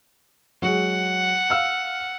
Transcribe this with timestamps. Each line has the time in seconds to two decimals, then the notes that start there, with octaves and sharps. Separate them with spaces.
0.62 F#3 G#3 F#5
1.50 F5 E6 F6